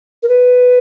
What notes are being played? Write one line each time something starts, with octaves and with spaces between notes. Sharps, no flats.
A#4
B4